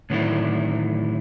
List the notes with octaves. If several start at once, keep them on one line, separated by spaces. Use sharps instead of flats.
A2 D3 D#3 F#3 D4 E4